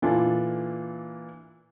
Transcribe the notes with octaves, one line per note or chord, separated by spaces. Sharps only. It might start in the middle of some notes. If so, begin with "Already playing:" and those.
A#2 E3 D4 F4 A4 B4